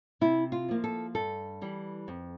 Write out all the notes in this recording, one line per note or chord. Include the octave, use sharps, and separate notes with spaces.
C3 E4
F4
F3 A#3
A4
G2 A4
E3 G3
F2